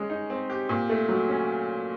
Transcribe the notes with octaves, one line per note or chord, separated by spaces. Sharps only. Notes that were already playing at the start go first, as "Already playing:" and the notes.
Already playing: G#3 C#4
D#4
C4
G4
A#2
A3
F#3
C#4